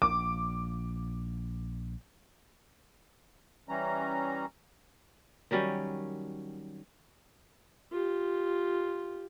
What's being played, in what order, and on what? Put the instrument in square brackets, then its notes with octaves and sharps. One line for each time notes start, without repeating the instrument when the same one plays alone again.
[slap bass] A#1 [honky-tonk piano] D6
[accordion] E3 G3 C#4 A#5
[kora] D#3 F#3 G3 C#4
[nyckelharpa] F4 G4